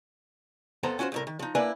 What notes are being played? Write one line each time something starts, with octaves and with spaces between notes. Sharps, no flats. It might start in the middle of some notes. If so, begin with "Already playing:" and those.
F2 B3 A4 C5 A#5
C#4 F4 F#4 B4 C5
C2 A2 A#4
D#3
F3 D#4
A#3 D4 E4 A#4 B4 G#5